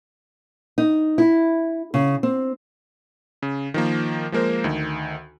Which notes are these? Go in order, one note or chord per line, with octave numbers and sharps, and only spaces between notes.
D#4
E4
C#3
C4
C#3
D#3 F3 A#3
F3 G#3 A#3 A#4 C5
D2 D#3